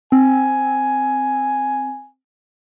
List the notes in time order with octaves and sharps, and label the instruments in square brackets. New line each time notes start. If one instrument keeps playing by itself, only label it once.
[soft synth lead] C4 [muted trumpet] G#5